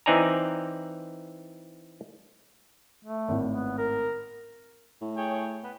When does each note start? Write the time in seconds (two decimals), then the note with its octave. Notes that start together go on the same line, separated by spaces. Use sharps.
0.06 E3 C4 D#4 D5 G#5 A#5
3.05 A3
3.28 G#1 A2
3.49 B3
3.78 A#4
5.01 A2
5.17 G#4 C#5 G5
5.64 B3